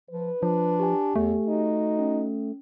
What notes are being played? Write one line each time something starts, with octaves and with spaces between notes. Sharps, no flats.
F3 B4
F3 D4
G4 G#5
E2 A3
D#4 F#4
C#4